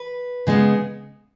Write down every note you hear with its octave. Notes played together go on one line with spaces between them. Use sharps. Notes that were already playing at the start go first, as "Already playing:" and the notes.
Already playing: B4
C#3 G#3 B3